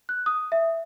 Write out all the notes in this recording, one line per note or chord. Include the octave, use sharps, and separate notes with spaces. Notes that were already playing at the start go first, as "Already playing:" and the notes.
F#6
D#6
E5